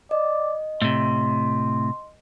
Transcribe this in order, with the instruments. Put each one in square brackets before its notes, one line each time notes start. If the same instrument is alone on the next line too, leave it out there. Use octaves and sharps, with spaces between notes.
[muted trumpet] D5 [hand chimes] D#5
[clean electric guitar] A2 C3 [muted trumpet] C6